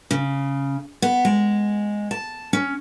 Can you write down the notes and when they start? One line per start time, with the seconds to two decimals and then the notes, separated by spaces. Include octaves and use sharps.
0.11 C#3
1.02 B3
1.25 G#3
2.11 A5
2.53 C#4